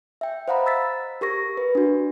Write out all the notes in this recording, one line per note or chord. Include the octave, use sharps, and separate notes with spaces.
E5 G5
C5 D#5 F5 F#5 A#5 B5
E6 A6 B6
G4 A#4 C#6 A#6
B4
D4 F#4